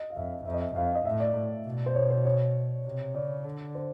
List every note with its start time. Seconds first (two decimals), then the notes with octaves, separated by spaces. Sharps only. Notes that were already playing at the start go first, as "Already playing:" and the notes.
Already playing: D#5
0.10 F5
0.16 F2 E5
0.45 F2 E5
0.54 D#5
0.60 E5
0.75 F2 F5
0.95 D#5
1.05 A2 E5
1.20 D5
1.66 B2
1.86 C5
1.95 C#5
2.10 C5
2.25 C#5
2.85 C3
3.14 C#3 D5
3.45 D3
3.75 C5